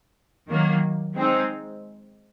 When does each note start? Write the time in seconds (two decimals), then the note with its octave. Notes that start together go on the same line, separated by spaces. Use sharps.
0.49 D#3 F#3 A#3
1.16 G#3 C4 D#4